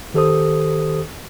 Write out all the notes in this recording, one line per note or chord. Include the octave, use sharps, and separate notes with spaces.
D#3 G4 A4 C5 D#6